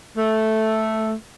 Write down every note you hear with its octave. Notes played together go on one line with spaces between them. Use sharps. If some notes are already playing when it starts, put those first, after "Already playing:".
A3